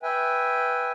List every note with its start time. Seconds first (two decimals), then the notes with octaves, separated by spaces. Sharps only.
0.03 B4 E5 G5 G#5